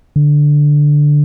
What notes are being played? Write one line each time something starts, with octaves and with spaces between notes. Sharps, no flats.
D3